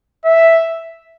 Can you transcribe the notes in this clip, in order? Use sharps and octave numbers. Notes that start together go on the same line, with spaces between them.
E5